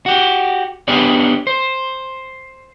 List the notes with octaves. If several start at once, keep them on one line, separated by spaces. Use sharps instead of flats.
F#4 G4
B3 D4 G4 G#4 C#5 D5
C5